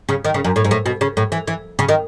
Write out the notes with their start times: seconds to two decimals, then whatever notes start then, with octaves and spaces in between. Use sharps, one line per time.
0.09 C#3
0.25 D#3
0.34 C#3
0.45 F#2
0.56 A2
0.65 G#2
0.71 A2
0.86 B2
1.01 C#3
1.17 A2
1.32 E3
1.47 E3
1.79 C#3
1.89 D#3